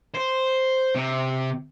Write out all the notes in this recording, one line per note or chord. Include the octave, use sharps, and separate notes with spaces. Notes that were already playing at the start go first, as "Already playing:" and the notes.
C5
C3